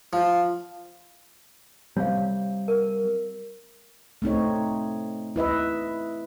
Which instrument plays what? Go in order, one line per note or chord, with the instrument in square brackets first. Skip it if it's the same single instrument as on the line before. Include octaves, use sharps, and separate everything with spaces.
[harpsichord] F3
[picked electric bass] G3 C4 [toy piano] C#5 F5
[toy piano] A#4
[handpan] A3 C4 D#4 C#5
E4 B4 D#5 E5